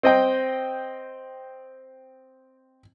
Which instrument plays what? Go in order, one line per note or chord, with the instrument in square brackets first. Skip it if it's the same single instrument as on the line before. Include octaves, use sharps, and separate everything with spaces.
[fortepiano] C4 D#5 G5